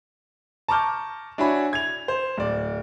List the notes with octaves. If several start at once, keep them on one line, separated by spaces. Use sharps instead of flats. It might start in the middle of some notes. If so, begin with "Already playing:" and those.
A5 A#5 C#6 D6 F6 G6
D4 E4 F#4 C#5 G#5 B5
G#6 F7
C5
D1 D5